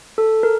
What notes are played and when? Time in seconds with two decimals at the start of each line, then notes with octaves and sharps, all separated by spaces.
0.18 A4
0.43 A#4